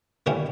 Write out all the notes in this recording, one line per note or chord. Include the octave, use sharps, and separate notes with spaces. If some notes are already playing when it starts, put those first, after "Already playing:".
D3 G3 A#3 C#4 E4